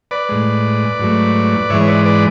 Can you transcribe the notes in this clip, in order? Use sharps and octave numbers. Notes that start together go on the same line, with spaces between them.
B4 D5
A2 G#3
G#2 F#3 A3
G#2 E3 G#3 C#5 E5
B4 D5
B4 D5